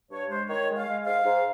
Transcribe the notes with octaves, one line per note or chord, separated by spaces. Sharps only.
G2 C#5
G#3 C5
D#3 C#5
G#3
F5
G#3
G#2 F5
G#2